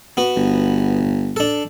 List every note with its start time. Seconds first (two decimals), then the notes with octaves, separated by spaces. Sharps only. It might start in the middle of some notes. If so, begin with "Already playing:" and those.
0.17 B3 F#4
0.36 G1
1.36 D4 A4